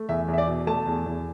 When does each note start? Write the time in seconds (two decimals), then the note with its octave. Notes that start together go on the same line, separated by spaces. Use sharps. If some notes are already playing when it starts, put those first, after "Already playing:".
Already playing: A3
0.09 E2 E5
0.28 E2
0.33 E5
0.38 D5
0.48 B2
0.67 A3 A5
0.87 E2
1.06 E2